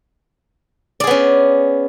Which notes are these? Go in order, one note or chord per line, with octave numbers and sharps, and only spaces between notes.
B3 C#4 G#4 D5